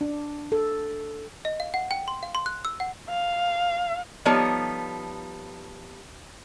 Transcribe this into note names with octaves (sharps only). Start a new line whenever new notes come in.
D4
A4
D#5
F5
F#5
G5
C6
F5
C6
F#6
E6
F#5
F5
F3 G3 B3 D#4 A4 C#5